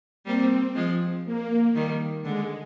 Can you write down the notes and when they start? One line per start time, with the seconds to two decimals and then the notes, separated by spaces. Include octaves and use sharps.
0.26 G3 A#3 C4
0.75 F3 G#3
1.25 A#3
1.75 D#3 G3
2.24 D3 G#3